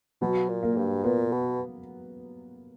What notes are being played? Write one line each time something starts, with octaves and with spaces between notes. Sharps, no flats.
B2 F#3
A#2
A#3
G2
A#2 B3
B2